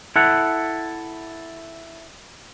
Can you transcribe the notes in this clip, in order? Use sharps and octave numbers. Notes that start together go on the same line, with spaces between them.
E4 A4 F#5